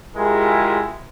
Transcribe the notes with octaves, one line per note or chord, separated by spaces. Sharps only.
G#3 E4 F4 G4 G#4 A#4